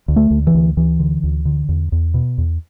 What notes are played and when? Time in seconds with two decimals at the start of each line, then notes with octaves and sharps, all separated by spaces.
0.08 D2
0.16 A3
0.31 D2
0.47 E3
0.54 D2
0.77 D2 E3
0.99 D3
1.23 D2
1.45 D3
1.69 E2
1.92 E2
2.14 B2
2.38 E2